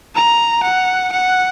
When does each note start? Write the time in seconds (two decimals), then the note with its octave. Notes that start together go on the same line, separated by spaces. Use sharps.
0.15 A#5
0.63 F#5
1.12 F#5